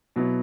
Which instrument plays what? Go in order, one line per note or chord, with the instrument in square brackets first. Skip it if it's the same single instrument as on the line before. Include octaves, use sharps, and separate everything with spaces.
[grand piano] B2 F#3 B3 E4